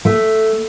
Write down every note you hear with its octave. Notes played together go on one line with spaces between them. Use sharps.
A3